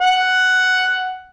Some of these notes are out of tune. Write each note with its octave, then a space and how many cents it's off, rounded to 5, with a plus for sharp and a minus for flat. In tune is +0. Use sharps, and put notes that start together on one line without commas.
F#5 +5